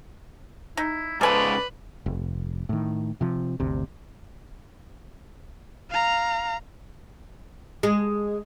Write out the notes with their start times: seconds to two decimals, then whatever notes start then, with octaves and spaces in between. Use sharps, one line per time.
0.77 D#4 E4
1.21 G#2 C#3 F4 A4 B4 D5 G#5 A5
2.06 F1
2.69 A2 D#3
3.21 C3 F3
3.60 G1 D2 C3
5.91 F5 A#5
7.83 G#3